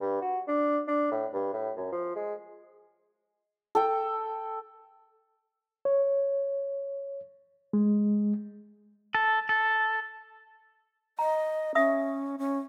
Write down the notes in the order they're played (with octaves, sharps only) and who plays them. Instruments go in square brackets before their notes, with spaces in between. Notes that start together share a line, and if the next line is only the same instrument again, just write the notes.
[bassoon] G2
F#4
D4
D4
A2
G2
A2
F#2
F3
G#3
[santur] A4 G5
[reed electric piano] C#5
G#3
[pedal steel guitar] A4
A4
[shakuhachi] D#5 [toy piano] A#5
[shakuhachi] C#4 [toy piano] E5 D#6
[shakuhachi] C#4